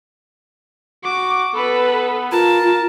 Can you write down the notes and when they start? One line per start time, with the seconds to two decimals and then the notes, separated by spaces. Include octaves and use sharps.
1.04 F#4 D6
1.55 B3 A4 B4
2.32 F4 A#4 A5